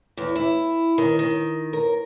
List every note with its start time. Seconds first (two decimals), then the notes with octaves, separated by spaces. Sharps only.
0.17 E2
0.35 E4
0.98 D#3
1.19 D#3
1.73 A#4